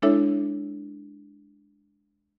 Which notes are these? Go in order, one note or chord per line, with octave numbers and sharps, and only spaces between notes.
G#3 D4 E4 A4 C#5 E5